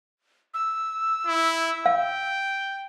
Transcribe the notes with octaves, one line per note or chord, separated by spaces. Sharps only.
E6
E4
F5 G5